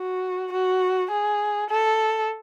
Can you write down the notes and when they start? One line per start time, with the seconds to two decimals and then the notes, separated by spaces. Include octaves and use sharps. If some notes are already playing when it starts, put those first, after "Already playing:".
Already playing: F#4
0.52 F#4
1.11 G#4
1.70 A4